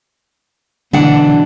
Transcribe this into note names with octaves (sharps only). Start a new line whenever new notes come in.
B2 D3 E3 F#3 D4 F#5